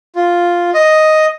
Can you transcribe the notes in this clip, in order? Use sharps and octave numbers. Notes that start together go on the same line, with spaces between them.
F4
D#5